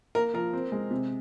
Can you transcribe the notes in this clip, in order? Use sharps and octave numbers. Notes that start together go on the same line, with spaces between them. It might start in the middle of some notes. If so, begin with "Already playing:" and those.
A#3 A#4
F3 A#4
C4
G#3
C3